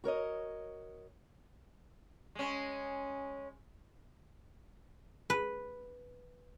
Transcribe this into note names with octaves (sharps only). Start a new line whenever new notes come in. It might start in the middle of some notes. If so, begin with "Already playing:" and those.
F#4 A#4 C#5 D#5
G#3 C#4
B4